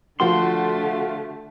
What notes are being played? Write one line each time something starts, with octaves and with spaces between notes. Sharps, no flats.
D3 F3 A3 F4 F#4 C6